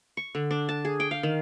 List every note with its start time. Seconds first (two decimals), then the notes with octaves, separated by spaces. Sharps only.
0.17 C#6
0.35 D3
0.51 D4
0.69 A5
0.85 G#4
1.00 G5
1.11 F5
1.23 D#3